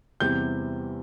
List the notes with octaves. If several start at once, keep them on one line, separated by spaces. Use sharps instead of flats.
E2 C3 E3 G3 G6